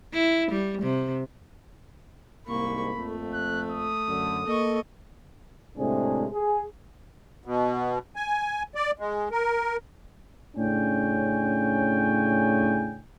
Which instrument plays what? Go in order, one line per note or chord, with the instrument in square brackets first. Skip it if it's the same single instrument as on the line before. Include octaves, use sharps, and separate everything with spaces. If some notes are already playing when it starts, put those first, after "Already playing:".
[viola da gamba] E4
G3
C3
[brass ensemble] C2 G#2 [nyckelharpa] A#3 C#6 [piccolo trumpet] B5
[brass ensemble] F2 [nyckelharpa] A3
[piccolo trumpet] F#6
D#6
[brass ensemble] F#2 D3
[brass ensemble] A#3 A4 [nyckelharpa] D#5 C#6
[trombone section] A2 C3 G#3 C4 D4 G#4
G#4
[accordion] B2
G#5
D5
G#3
A#4
[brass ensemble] A2 C#3 C#4 D4 G5 G#5